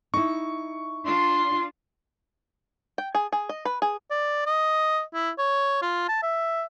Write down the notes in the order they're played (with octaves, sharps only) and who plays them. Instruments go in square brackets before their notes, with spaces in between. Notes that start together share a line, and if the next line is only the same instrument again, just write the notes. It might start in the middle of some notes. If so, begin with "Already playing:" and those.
[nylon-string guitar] D#4 E4 [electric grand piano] C#6
[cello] D4 F4 [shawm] C6
[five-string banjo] G5
G#4
G#4
D#5
B4
G#4
[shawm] D5
D#5
E4
C#5
F4
A5
E5